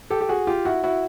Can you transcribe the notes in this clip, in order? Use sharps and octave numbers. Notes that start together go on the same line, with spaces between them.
G4 A4
G4
F#4 G#4
F4 G4
E4 F#4
E4 F#4